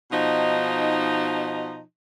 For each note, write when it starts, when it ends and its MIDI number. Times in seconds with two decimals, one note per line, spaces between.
0.12 1.81 47
0.12 1.81 53
0.12 1.81 63